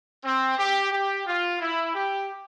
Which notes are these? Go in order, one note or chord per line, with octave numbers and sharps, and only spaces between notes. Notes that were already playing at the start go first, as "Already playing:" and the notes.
C4
G4
G4
F4
E4
G4